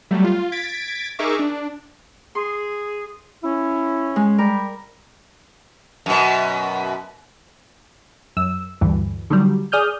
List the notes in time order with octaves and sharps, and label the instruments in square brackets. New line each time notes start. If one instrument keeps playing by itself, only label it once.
[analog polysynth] F#3 G3 A3
F4
G#6 A6 B6 D7
D#4 G#4 A#4 E5 C#6 D6
D4
[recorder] G#4 [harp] C6
[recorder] C#4 [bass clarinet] E4
[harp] G#3
[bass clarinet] G3 [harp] A#4
[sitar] F#2 B2
[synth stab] F#2 E6
D2 G2 E3
D3 D#3 F#3 G3
G#4 D5 D#6 F6 G6